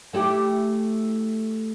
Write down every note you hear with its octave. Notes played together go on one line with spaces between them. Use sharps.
A3 E4 G4